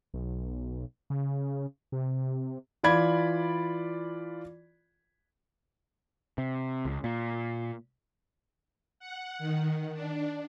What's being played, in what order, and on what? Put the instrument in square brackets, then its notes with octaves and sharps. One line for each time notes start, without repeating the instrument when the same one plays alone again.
[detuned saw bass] B1
C#3
C3
[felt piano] E3 F4 D5 B5 G#6
[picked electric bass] C3
C#2
A#2
[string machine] F#5
D#3
D4